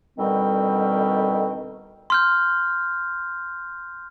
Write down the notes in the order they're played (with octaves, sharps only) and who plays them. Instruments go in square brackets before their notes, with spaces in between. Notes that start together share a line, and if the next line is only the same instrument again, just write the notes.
[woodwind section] B2 D3 D#3 G3 C4
[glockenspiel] C6 F6 G6